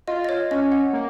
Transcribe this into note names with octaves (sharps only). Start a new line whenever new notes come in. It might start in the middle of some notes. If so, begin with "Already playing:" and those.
F4 D#5
D#5
C#5
C#4 D#5
F#5
A#3